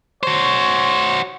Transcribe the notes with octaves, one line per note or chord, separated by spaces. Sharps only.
F#4 C5 C#5